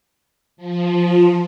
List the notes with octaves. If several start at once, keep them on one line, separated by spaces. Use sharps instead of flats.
F3